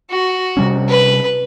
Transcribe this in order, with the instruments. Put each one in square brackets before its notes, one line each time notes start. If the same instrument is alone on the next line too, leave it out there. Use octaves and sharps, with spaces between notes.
[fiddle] F#4
[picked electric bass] C3 G3 C#4
[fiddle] B4